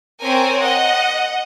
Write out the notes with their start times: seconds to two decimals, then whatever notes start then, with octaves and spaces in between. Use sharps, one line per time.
0.21 C4 A#4 C#5 G#5
0.61 D#5 F#5